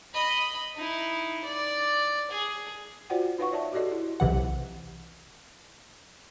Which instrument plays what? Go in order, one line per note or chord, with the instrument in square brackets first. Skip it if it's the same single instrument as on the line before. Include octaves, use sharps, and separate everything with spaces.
[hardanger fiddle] D#5 B5
D#4 E4
D5
G#4
[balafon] F4 F#4 C5 D5 F#5 G5
D#4 B4 C#5 F5 F#5 C#6
C#5 D5 E5 A5
F#4 G4 A4 D5 D#5
E4
[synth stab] B1 C3 E3 F#5